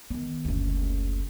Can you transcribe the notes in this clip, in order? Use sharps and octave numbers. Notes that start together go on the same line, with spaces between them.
D#3 B3
F#1 D2